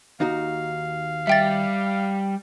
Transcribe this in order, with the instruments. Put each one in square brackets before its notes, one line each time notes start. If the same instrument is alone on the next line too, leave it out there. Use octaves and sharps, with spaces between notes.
[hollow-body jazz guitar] D#2 D#4 F#4 [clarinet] F5
[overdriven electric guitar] G3 [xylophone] E5 G5 A6